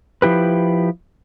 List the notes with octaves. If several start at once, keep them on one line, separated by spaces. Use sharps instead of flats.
F3 E4 G4 B4